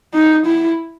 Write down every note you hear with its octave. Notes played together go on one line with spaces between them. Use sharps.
D#4
E4